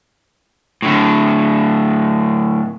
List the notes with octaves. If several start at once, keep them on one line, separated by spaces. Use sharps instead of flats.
A2 D3